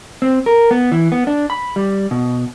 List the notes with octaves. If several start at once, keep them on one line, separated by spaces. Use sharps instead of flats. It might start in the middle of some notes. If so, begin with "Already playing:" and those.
C4
A#4
B3
E3
B3
D4
B5
G3
B2